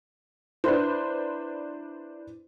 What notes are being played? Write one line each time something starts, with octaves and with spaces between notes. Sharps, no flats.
D4 E4 B4 C5